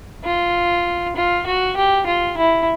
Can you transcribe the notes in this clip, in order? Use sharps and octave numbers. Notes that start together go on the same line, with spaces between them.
F4
F4
F#4
G4
F4
E4